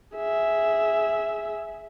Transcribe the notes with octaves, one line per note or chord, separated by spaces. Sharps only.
G#4 E5